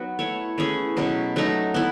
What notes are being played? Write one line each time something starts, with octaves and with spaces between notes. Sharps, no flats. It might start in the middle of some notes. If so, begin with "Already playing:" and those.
Already playing: F#3 B3 D#4 F#4
A3 E4 A4 C#5
E3 A3 C#4 G#4
B2 F#3 C#4
F#3 A3 D#4
B3 E4